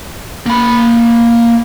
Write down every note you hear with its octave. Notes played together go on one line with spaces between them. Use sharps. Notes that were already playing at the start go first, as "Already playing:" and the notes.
A#3 B5